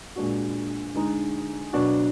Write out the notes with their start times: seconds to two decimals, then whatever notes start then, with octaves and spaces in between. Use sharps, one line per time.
0.16 A#2 G#3 D4 F#4
0.94 D3 G#3 D#4
1.73 B2 F#3 D4 F#4